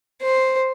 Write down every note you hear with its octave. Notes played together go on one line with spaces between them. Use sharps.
C5